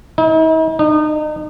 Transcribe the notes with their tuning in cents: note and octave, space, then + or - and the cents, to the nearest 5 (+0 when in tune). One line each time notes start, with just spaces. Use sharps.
D#4 +45
D#4 -35